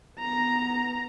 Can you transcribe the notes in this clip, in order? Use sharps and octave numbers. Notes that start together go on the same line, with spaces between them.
B3 A#5